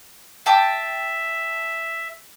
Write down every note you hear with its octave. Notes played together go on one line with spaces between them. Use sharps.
E5 G5 A5 D6